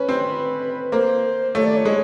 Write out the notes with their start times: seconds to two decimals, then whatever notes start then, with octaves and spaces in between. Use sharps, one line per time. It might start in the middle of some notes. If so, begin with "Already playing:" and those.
Already playing: C#4 B4
0.09 C4
0.91 A#3 C5
1.54 A3 C#5
1.65 D5
1.76 C#5
1.85 G#3